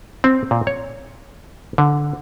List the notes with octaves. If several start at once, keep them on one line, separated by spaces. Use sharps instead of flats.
C4
A#2
C#5
D3